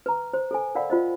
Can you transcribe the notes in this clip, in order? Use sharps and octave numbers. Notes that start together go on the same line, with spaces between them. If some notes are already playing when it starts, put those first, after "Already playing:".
B4 A#5
C5
A4 C5 G#5
A#4 D5 F5 F#5 B5
F4 C5 D#5